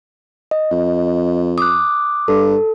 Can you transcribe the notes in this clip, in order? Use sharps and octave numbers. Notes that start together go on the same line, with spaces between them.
D#5
F2 D#5
D6 D#6 F#6
G2 A4